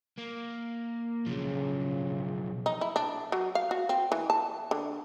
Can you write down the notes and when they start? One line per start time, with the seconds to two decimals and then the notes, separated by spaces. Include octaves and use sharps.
0.18 A#3
1.26 B1 C#3 F3
2.66 D#4
2.81 E4
2.96 D4
3.32 F#3
3.55 F5
3.71 F#4
3.89 C4
4.12 E3
4.30 A5
4.71 D3